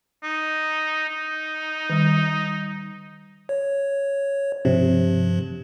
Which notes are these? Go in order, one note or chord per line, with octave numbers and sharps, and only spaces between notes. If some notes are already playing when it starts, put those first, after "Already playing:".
D#4
D#4
D#3 G3
C#5
G2 C3 F3